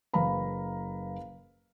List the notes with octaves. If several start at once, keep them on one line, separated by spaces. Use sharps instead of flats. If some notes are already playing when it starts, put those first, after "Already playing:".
F#1 B4 F5 A#5 B5